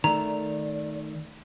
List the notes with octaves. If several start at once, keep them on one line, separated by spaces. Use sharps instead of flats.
D#3 A3 D5 A#5